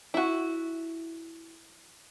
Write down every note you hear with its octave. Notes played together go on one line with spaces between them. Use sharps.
E4 F#4